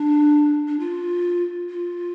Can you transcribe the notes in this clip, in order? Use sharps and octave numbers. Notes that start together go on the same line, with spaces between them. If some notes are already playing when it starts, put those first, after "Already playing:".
Already playing: D4
D4
F4
F4